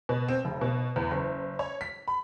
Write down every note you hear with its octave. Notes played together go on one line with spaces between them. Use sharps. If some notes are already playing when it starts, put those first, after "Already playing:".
B2
C4
F1
B2
E2
F#1
C#5
B6
B5